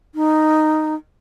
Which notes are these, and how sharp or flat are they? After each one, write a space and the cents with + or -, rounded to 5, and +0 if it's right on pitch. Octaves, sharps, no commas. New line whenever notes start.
D#4 -5